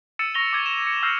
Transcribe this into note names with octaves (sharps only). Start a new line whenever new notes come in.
E6 A6 C#7 D#7 E7
C#6 A#6 F7 G7
D6 G#6 A6 E7
C#7 D#7 E7
C#7
E6 F6 G6 A#6 C7